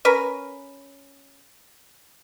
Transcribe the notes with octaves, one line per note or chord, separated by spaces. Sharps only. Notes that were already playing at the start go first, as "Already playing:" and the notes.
C#4 A#4 B4